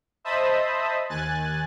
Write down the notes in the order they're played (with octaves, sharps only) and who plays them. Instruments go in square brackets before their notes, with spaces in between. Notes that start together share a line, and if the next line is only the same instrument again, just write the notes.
[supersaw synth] C5 D#5 E5 A5 B5 D#6
D#2 G#5 F#6 A6